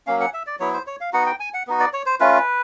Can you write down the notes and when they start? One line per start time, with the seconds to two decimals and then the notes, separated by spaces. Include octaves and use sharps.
0.07 F#3 A#3 C#4 F5
0.20 F#5
0.34 E5
0.47 D5
0.59 F#3 B3 E4 C#5
0.73 C5
0.87 C#5
1.01 F5
1.13 B3 D#4 F#4 F#5
1.26 G5
1.40 G#5
1.54 F#5
1.67 B3 D#4 F#4
1.80 D5
1.93 C#5
2.06 C5
2.20 A3 C#4 F4 B4